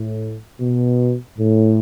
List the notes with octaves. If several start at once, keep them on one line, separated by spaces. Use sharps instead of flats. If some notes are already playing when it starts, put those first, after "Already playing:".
Already playing: A2
B2
A2